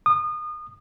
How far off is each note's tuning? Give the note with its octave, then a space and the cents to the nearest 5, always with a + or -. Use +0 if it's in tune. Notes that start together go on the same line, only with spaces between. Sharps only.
D#6 -30